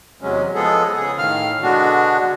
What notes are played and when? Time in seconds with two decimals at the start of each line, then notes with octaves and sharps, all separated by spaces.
0.22 E2 C3 F#3 G#3 C#4
0.55 F3 G#3 B3 G#4 A4
0.96 C#3 G#4
1.18 A2 D#3 F5 F6
1.63 B2 D3 G#3 B3 D4 F#4